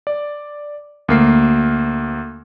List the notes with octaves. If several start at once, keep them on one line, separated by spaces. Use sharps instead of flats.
D5
D2 A#3 C7